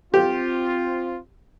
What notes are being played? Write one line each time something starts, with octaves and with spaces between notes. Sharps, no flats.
C4 F4 G4